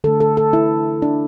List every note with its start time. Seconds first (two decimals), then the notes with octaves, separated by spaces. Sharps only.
0.04 D3 A4
0.07 A3
0.20 A4
0.37 A4
0.53 E4
1.02 D4